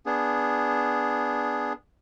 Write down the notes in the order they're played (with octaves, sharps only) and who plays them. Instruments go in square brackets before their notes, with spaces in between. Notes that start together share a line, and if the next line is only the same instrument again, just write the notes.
[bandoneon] B3 D4 G#4